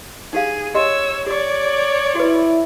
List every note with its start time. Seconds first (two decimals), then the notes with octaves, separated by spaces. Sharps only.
0.33 D#4 G4 G#4 F5
0.75 G4 C#5 D#5 C6 E6
1.26 G4 C#5 D5 C#6
2.15 E4 F#4 B4